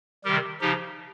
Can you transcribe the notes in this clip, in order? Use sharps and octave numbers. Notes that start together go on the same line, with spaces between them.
C3 D#3 G3 G4 A#4
C#3 F3 D#4 G4